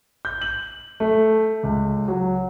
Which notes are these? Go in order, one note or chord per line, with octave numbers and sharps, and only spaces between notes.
G6
F#7
A3
C#2
F#3